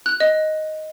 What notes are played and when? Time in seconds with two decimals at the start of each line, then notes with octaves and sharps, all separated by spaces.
0.06 F#6
0.20 D#5